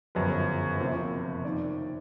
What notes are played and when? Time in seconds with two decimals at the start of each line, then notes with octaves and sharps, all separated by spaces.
0.15 G1 F#2 C#3 F3 B4
0.80 F#1 F2 C3
1.44 D#3 D5